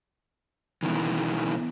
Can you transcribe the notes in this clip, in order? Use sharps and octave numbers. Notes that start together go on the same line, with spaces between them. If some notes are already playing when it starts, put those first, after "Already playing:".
B2 D#3 E3